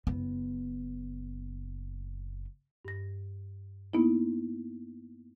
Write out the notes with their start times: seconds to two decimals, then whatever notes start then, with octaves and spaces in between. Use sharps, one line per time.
0.07 F#1 B3
2.85 G2 A#6
3.94 A#3 B3 D#4 E4